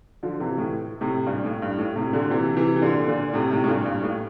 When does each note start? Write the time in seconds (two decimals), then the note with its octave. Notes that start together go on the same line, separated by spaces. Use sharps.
0.23 D3 F3
0.40 C3 E3
0.58 A2
1.01 A2 C3
1.26 G2 A#2
1.44 A2
1.62 G2
1.79 A2
1.96 A2 C3
2.13 A#2 D3
2.30 C3 E3
2.56 C3 E3
2.76 E3
2.82 A#2 D3
3.07 A#2 D3
3.33 A2 C3
3.51 A2 C3
3.64 A2
3.68 G2 A#2
3.85 G2
4.02 A2